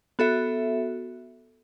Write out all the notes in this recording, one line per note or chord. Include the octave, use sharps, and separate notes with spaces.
B3 F#4 A4 E5